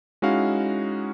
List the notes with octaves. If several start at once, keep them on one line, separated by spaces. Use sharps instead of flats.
G#3 C#4 D#4 E4 F#4 F5